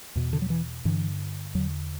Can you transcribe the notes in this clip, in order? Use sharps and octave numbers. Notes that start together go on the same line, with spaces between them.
E2 B2
D3
F#3
E3
G2 D3 E3
E2 D3 F#3